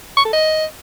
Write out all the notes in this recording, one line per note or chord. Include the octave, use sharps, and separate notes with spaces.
C#6
A4
D#5